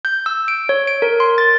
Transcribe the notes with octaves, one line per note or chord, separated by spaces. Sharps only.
G6
E6
D7
C#5
D7
A#4
C6
A6